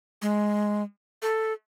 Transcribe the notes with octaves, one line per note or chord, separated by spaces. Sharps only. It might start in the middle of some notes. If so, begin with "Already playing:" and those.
G#3
A4